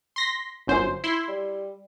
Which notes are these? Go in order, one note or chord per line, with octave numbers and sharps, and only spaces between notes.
C6 A#6 B6
G1 F#2 C5
E4 C6
G3